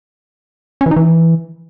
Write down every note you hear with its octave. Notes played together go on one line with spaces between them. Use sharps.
C#4
E3
D#4
E3